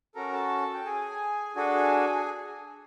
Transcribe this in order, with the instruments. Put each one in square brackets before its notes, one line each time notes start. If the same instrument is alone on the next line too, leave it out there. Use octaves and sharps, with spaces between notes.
[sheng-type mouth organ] C#4 F#4 A4 A#4 A#5
A4 A5
G5
G#4 G#5
D4 F#4 G#4 A4 G#5